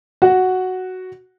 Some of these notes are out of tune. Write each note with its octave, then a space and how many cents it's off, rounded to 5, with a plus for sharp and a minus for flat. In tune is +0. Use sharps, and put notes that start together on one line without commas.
F#4 +0 F#5 +0